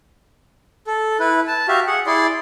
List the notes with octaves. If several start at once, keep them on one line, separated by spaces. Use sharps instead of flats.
A4
E4 B4
A5
F#4 G4 E5 F5
G#4 F#5
E4 G#4 D5 C6